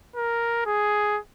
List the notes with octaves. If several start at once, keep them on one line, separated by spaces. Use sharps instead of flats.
A#4
G#4